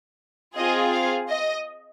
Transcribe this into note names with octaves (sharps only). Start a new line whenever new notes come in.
C4 F4 G#4 D#5
F5
D#5